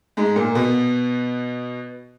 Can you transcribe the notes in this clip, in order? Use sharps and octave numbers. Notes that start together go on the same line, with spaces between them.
G#2 G#3
A#2 A#3
B2 B3